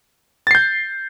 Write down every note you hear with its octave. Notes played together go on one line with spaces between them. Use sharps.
G6 A6 C7